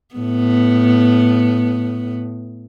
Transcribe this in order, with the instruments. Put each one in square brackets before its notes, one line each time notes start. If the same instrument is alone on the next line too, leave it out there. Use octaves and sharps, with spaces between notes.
[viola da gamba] A2 B3